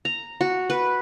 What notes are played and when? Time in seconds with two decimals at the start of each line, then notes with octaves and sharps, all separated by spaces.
0.05 A#5
0.41 F#4
0.70 B4